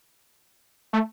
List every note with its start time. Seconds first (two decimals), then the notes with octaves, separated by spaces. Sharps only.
0.93 A3